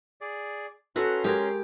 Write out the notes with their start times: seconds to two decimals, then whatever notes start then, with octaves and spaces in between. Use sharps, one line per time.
0.21 G#4 D5
0.96 C#4 F#4 A4 B4 A#5 C6
1.24 G#3 G4 A#4 G#6